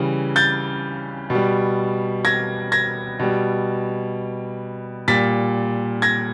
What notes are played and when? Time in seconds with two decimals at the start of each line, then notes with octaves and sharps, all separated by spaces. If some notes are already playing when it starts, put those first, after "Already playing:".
Already playing: C#3 E3 G3
0.36 G6 A6
1.30 B2
1.35 G3
2.25 G#6 A#6
2.72 G#6 A#6
3.20 B2 G3
5.08 A#2 G3 A6 B6
6.02 G#6 A#6